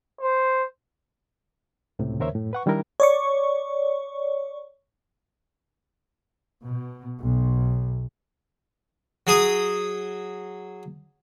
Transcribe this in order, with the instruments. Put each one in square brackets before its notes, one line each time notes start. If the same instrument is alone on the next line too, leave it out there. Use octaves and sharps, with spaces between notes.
[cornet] C5
[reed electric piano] C#2 A2 C3
D#2 C#3 A#4 C5 C#5 E5
F#2 A2
B4 F#5 C#6
D#3 G3 D4 E4 A#4
[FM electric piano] C#5 D5 C#6
[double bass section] B2
B1
[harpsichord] F#3 G#4 D#6